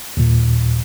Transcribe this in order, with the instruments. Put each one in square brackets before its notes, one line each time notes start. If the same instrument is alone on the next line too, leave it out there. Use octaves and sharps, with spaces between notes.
[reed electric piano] D#2 A#2